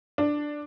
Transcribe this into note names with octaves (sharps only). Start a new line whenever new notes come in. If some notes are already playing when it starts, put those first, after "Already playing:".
D4